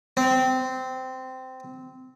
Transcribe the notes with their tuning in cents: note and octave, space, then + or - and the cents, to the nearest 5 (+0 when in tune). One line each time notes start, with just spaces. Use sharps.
C4 -15